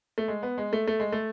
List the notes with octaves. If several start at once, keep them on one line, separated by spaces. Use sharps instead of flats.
A3
G#3
B3
G#3
A3
A3
G#3
A3